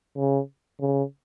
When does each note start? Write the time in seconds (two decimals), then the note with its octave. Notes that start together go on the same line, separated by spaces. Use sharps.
0.17 C#3
0.80 C#3